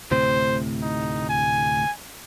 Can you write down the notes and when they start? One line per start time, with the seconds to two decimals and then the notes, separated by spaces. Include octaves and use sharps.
0.11 D2 A2 C3 C5
0.82 D#4
1.29 G#5